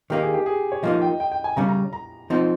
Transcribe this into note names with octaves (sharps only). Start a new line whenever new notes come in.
D#3 A#3 D#4 G4
G#4
G4
G#4
C#5
F3 A#3 D#4 D#5
G5
G5
G5
G#5
C#3 G3 C#4 A#5
A#5
A#5
F3 C4 D#4